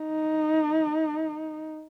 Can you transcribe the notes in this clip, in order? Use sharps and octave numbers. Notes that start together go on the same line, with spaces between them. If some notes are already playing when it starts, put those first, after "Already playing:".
Already playing: D#4